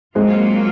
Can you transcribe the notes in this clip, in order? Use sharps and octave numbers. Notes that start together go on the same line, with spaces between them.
F#3 G#3 A#3 C4 F4